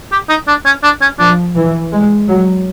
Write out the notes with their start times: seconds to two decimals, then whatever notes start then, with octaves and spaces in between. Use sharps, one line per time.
0.12 G4
0.29 D#4
0.47 D4
0.65 C#4
0.83 D4
1.01 C#4
1.19 F3 D4
1.56 E3
1.92 G#3
2.28 F#3